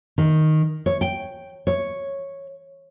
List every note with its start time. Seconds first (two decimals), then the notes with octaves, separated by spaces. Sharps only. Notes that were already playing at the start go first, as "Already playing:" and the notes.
0.18 D#3
0.86 C#5
1.01 G5
1.67 C#5